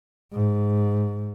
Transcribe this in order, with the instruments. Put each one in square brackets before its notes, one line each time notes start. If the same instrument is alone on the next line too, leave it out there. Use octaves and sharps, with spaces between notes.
[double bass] G#2